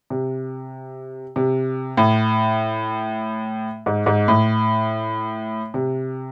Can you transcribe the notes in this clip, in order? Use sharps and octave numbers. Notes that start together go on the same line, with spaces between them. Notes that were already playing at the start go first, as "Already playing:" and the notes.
C3
C3
A2
G#2
G#2
A2
C3